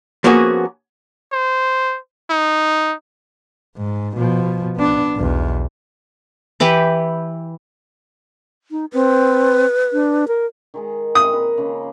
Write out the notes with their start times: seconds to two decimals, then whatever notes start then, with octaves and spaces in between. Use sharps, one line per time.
0.24 F3 A#3 B3 C#4 F#4 G#4
1.32 C5
2.30 D#4
3.77 G#2
4.17 B2 F3
4.76 B3 D4
5.15 B1 E2
6.60 E3 E4 G4 B4
8.71 D#4
8.93 C4 B4
9.93 D4
10.28 A#4
10.74 D#3 G#3 G#4
11.15 A#2 C4 D#6
11.33 D#4 B4
11.58 C#3 F3 A#3